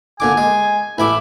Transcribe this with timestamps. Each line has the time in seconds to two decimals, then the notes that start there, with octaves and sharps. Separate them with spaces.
0.20 A#2 D3 G#5 D6
0.37 G#3
0.98 A1 E4 G#5 D6